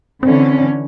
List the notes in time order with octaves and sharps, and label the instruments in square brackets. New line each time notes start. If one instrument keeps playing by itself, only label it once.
[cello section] D3 E3 C#4 [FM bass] C4